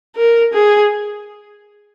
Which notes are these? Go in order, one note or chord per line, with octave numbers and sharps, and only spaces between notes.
A#4
G#4